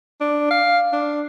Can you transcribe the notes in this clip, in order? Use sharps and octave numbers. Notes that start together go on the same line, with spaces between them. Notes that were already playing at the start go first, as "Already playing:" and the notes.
D4
F5
D4